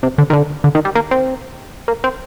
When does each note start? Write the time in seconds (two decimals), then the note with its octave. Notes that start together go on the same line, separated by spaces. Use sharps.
0.03 C3
0.18 D3
0.30 D#3
0.33 D3
0.64 D3
0.75 D#3
0.85 G3
0.95 A#3
1.11 C4
1.88 A#3
2.04 C4